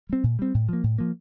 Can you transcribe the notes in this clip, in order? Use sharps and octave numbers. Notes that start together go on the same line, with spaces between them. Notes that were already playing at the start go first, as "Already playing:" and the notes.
G3 C4
A#2
G3 C4
A2
F3 A#3
A2
F3 A#3